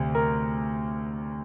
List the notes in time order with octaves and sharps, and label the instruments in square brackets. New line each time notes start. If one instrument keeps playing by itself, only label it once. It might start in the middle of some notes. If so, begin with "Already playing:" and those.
Already playing: [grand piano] D2 C3
A#4